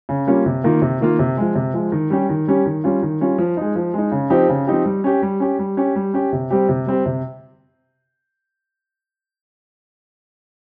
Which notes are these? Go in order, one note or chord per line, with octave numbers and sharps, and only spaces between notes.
C#3
G3 A#3 C#4 F4
C3
D#3 A#3 F4
C3
D#3 A#3 F4
C3
F3 G#3
C3
F3 G#3
D#3
G3 C#4 G4
D#3
G3 C#4 G4
D#3
G3 C#4 F4
D#3
G3 C#4 F4
F3
G#3 D#4
F3
G#3 D#4
C#3
F3 C4 D#4 G4
C#3
F3 C4 D#4 G4
G3
C#4 G4
G3
C#4 G4
G3
C#4 G4
G3
C#4 G4
C3
G3 C4 G4
C3
G3 C4 G4
C3